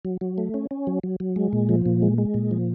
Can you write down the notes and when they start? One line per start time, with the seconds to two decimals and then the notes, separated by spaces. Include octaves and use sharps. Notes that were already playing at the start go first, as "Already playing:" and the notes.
0.05 F#3
0.21 F#3
0.38 A3
0.54 C#4
0.71 C#4
0.87 F#3
1.03 F#3
1.20 F#3
1.36 G#3
1.53 A#2
1.69 F3
1.86 A#2
2.02 G#3
2.18 G#3
2.34 A#2
2.51 F3